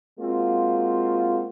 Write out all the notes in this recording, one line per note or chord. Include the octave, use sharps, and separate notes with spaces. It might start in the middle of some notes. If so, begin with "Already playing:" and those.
G#3 A#3 C4 F4 F#4